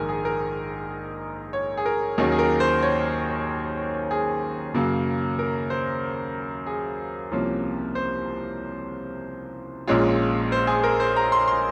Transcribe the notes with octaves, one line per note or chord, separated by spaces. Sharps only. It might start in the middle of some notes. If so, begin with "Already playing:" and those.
Already playing: A#1 G#2 D#3 G#3 A#4 G#5
G#4
A#4
C#5
G#4
A#4
D#2 D#3 F#3 A#3 C#4 G#4
G#4
A#4
C5
C#5
G#4
F#2 C#3 F#3 A#3
A#4
C5
G#4
C2 C3 F3 A#3 C#4
C5
A#1 A#2 G#3 C#4 F4
C5
G#4
A#4
C5
A#5
C6
C6